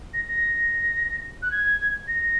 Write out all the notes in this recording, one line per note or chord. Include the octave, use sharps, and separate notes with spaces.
A#6
A#6
F#6
G#6
A#6